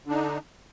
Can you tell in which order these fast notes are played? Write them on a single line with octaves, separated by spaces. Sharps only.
D3 D4 D#4